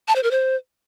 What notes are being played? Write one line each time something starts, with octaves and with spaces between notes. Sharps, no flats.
A5
C5
A#4
C5